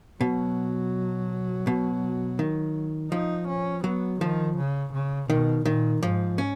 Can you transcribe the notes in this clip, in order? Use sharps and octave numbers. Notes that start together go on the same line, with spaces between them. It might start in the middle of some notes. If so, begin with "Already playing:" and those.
B2 F#3
B2
D#3
F3 D#4
C#4
F#3 B3
D#3 F3
C#3
C#3
B2 D#3
A#2 D#3
G#2 F3
C#4